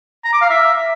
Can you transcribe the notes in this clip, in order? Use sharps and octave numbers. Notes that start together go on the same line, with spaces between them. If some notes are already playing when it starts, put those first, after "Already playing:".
A#5
D6
F5
E5